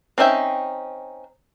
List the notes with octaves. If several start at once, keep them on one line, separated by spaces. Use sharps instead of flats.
C4 C#4 D#4 E5 G5